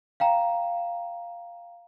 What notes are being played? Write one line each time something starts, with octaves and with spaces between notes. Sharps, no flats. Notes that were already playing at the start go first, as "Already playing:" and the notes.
F5 G5 A#5